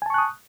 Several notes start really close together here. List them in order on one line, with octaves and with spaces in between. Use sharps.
G#5 A5 C#6 F#6 D#6